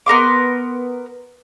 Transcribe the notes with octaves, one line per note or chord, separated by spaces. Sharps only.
B3 A#4 C6 D6